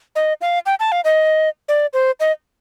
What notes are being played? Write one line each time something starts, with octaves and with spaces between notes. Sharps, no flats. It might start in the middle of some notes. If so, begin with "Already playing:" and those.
D#5
F5
G5
A5
F5
D#5
D5
C5
D#5